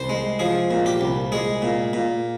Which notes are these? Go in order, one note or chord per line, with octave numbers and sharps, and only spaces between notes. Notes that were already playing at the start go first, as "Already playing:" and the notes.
Already playing: C2 C5
G#3
F3 G#4
A#2
G4
C2
G#3 G#4
A#2
A#2